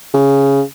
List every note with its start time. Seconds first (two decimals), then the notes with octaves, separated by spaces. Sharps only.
0.14 C#3